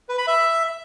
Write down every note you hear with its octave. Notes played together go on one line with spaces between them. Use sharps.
B4
B5
E5